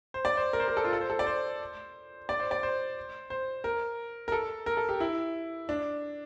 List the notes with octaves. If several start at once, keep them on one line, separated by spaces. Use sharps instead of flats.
C5
D5
C5
A#4
C5
A#4
A4
F4
A4
C5
A4
D5
C5
D5
C5
D5
C5
C5
A#4
A#4
A4
A#4
A4
G4
E4
D4